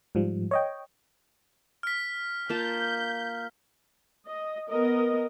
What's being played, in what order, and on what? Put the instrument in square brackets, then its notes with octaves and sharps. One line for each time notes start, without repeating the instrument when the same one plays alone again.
[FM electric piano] G#2 F3 G3
C#5 D#5 G5
[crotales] F6 B6
[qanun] A#3 F4 A5 [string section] G6
[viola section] D#5
B3 A#4 D#5